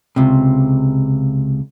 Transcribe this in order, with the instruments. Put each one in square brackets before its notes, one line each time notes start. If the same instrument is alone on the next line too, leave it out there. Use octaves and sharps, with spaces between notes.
[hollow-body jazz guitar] C#2 C3